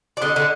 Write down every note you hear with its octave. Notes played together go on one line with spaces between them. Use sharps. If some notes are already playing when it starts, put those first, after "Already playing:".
D5
D3 D#5
D3